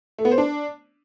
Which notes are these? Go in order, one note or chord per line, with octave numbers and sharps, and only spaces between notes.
A3
B3
C5
D4